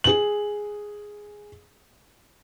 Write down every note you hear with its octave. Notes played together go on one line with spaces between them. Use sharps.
G#4 F#7